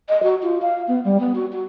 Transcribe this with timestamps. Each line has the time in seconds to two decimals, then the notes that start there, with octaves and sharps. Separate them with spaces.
0.09 D#5
0.23 F#4
0.43 F4
0.62 F5
0.88 B3
1.05 G3
1.20 B3
1.35 F#4
1.52 F#4